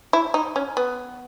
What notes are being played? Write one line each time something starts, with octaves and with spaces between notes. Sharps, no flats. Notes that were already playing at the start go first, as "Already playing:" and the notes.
E4
D#4
C#4
B3